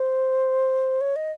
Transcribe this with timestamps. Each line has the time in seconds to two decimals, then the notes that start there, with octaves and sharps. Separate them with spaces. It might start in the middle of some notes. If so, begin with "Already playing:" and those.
Already playing: C5
1.01 C#5
1.16 D#5